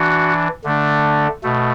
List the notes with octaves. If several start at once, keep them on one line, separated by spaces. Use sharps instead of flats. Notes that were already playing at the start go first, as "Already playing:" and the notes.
Already playing: E3 D4 F#4 F#5
D3 A3 D4
B2 A3